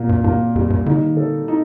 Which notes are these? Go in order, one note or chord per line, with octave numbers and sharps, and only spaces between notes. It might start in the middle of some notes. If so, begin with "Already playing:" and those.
Already playing: A#2 A#3
G2
G2 A#3
F2 G3
G2
D3 D#4
D#3
D3 A4
D#4